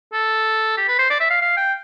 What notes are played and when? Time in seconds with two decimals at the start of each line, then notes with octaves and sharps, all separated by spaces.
0.13 A4
0.77 G4
0.88 B4
0.99 C5
1.10 D5
1.20 E5
1.30 F5
1.42 F5
1.57 G5